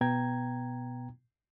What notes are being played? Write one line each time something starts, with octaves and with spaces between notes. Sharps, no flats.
B2 B3 G5 A#5 G#6